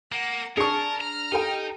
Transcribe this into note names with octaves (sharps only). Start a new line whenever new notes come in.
A#3 F#5
D4 G#4 A#4 A5 C#6 C#7
A#5 F6
D#4 G4 A4 G5